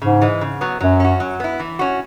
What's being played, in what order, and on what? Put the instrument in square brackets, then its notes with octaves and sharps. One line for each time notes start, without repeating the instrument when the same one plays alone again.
[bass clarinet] G#2 [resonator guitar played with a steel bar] C#3
[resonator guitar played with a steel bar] E3 G#3
C#3
F#3 B3
[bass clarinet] F#2 [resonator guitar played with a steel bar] F#3
[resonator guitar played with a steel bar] C#4 F#4
F#3
B3 E4
E3
C#4 F#4